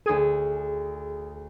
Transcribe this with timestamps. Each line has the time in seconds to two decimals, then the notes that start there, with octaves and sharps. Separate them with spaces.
0.06 D2 G#4 D#7